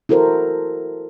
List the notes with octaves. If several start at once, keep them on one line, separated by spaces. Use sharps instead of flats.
E4 F#4 A4 A#4 C5